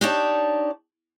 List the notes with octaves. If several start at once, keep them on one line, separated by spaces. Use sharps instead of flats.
D4 D#4 G4 C#5 D5 A5